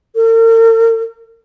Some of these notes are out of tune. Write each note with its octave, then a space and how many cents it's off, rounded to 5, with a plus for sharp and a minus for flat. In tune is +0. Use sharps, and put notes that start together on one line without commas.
A#4 -45